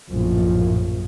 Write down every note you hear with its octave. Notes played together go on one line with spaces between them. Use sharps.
A#1 F#2 A2 F3